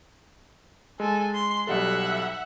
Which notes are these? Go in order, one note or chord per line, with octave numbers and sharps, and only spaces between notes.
G#3 A4 G#5
C6
B1 G3 A4 E5 F#5